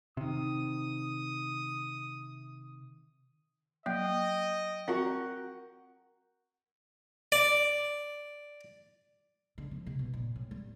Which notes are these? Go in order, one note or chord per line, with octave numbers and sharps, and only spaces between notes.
C3 D#3 D#6
F#3 A#3 D#5 E5 G5
C4 F#4 A#4 E5 F#5 A#5
D5
D3
F3
C3
B2
A#2
A2
G3